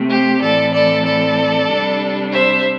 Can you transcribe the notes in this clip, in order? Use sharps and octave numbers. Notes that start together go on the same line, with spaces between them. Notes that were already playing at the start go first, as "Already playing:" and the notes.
Already playing: C3 A3 C4
G4 C5
A2 E3 C4 A4 D5
A4 D5
A4 D5
C3 G3 D4
C5 E5